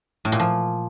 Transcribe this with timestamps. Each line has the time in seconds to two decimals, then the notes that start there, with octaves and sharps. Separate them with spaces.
0.25 A2
0.32 A#2
0.40 F3